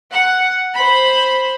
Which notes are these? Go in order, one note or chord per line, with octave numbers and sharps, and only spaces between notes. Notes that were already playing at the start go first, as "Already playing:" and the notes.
F#5
C5 B5